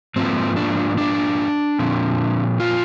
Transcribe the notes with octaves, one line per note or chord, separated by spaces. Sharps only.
G#2 F3 A#3 C4
D4
D4
A#2 F3 C4
F4